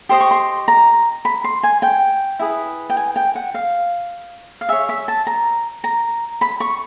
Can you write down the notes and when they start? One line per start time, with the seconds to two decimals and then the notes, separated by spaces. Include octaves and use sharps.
0.09 G4 C5 D#5 C6
0.20 C#6
0.31 C6
0.68 A#5
1.25 B5
1.44 C6
1.63 G#5
1.82 G5
2.39 E4 G#4 B4
2.90 G5
2.97 G#5
3.16 G5
3.35 F#5
3.54 F5
4.61 F5
4.69 G#4 C#5 E5
4.89 E5
5.08 A5
5.27 A#5
5.84 A#5
6.41 B5
6.60 C#6